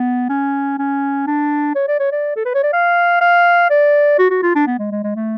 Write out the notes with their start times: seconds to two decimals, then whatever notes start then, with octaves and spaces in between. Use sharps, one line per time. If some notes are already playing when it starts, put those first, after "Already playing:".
Already playing: B3
0.30 C#4
0.79 C#4
1.27 D4
1.76 C#5
1.88 D5
2.00 C#5
2.12 D5
2.36 A4
2.45 B4
2.55 C#5
2.63 D5
2.73 F5
3.21 F5
3.70 D5
4.19 F#4
4.31 F#4
4.43 F4
4.55 D4
4.67 B3
4.79 G#3
4.91 G#3
5.04 G#3
5.16 A3